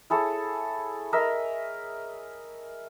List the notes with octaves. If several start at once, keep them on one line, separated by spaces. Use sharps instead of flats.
E4 G#4 A4 C#5
A#4 D#5 E5